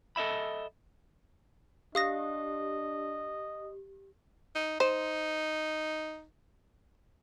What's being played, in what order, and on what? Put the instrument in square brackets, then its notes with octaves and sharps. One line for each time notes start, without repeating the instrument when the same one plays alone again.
[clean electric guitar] A4 D#5 E5 B5
[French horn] D4 [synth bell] G4 [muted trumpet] D#5 [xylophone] F5 D#6 A#6
[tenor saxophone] D#4
[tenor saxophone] D#4 [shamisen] C5